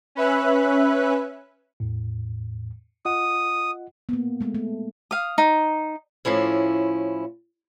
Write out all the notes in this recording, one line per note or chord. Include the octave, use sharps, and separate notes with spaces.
C#4 B4 E5 F#6
E2 A2
F4 D#5 F#5 D#6
A#3 B3
G#3 A3
A3
F5 D#6
D#4
A2 F3 C#4 E4